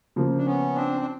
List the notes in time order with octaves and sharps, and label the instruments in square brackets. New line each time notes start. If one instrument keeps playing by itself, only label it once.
[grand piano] C#3 F3 A#3
[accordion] D4
B3 C#4
C4 D4
D4